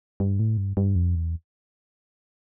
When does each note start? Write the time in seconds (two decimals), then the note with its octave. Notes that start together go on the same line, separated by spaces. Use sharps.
0.20 G2
0.39 A2
0.57 G2
0.77 G2
0.96 F2
1.15 E2